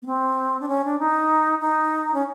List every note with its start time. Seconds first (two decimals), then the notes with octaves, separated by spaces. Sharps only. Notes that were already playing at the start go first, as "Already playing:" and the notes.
0.02 B3
0.06 C4
0.60 D4
0.68 C#4
0.85 D4
0.99 D#4
1.61 D#4
2.14 C#4